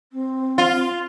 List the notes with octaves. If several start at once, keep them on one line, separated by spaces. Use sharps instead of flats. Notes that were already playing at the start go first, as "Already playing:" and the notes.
C4
F4